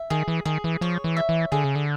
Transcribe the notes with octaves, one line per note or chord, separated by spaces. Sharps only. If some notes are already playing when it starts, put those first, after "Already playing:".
Already playing: E5
D#3 G#4
E3
D#3 G#4
E3
F3 C#5
E3
E5
E3
D3 G#4
C#3
D3